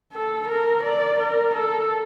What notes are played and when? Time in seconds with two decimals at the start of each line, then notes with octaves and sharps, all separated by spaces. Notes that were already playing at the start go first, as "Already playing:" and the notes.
0.13 A4
0.48 A#4
0.83 D5
1.19 A#4
1.55 A4